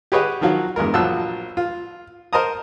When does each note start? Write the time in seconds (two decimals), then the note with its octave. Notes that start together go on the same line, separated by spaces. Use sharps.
0.12 G4 G#4 B4 C#5 D#5 F#5
0.41 D#3 F3 F#3 F#4 F5
0.76 E2 G2 G#3 A#4
0.94 A#1 F3 F#3 F#5 A5 E6
1.57 F4
2.33 A#4 C5 D#5 A5 A#5 D#6